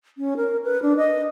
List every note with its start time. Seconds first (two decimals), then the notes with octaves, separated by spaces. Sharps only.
0.18 C#4
0.37 A#4
0.64 B4
0.82 D4
0.97 D#5